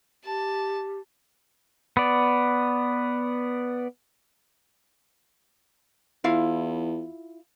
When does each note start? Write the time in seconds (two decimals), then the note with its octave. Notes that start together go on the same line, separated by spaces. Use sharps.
0.25 G4 A5
1.97 B3 D5
6.24 E2 E4 F4 F5